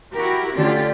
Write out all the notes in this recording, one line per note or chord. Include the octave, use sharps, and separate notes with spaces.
E4 F#4 G4 A#4
D3 A3 C#4 F4 G4 D5